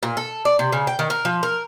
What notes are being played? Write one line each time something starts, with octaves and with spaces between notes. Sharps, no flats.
A#2
A4
D5
C3
C#3
G5
D#3
A#4
F3
A#4